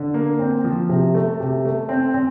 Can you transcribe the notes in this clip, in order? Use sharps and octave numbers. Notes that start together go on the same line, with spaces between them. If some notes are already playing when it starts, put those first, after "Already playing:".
Already playing: D3
A#3
C4
F3
C3
A3
C3
A3
C4
C4